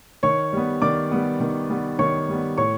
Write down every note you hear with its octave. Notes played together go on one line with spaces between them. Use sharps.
D#3 C#5 C#6
G3 B3
D#3 D5 D6
G3 B3
D#3
G3 B3
D#3 C#5 C#6
G3 B3
A2 C#5 C#6